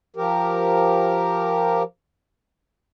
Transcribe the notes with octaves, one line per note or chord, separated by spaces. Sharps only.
F3 G4 A#4